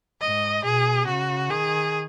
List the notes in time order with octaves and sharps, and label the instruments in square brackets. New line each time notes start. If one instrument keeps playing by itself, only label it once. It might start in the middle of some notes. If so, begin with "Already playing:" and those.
[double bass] G#2 [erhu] D#5
[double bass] B2 [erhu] G#4
[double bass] C#3 [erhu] F#4
[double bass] D#3 [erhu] G#4